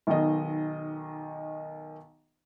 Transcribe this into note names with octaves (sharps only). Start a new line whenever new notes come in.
B1 D#3 D#5